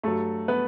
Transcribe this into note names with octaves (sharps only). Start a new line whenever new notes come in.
G2 F#3 A3 A4
B3 B4